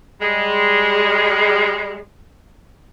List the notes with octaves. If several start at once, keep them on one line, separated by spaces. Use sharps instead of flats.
G3 G#3